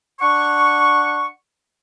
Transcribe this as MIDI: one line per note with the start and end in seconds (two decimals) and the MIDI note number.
0.20 1.26 62
0.20 1.26 78
0.20 1.26 85